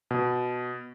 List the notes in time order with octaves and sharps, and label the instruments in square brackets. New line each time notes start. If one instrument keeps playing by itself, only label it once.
[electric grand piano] B2